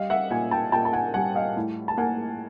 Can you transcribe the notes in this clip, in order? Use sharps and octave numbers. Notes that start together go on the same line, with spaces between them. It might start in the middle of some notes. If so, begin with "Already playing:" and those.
Already playing: G3 D#5 F5
E5 F#5
A#2 F#5 G#5
G5 A5
A#2 G5 A5
A5
F#5 G#5
G3 F#5 G#5
D#5 F5
A2
A5
A#3 F#5 G#5